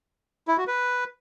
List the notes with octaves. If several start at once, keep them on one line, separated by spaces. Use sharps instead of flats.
E4
F#4
B4